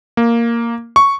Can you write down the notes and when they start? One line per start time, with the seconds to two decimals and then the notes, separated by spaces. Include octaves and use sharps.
0.17 A#3
0.96 C#6